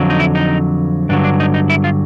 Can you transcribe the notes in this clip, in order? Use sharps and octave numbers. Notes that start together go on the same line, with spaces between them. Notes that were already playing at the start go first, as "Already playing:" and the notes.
Already playing: F2 D3 F#3
D#4
E4
D#4
G2 D3 F#3 D4
D4
D#4
D#4
E4
F4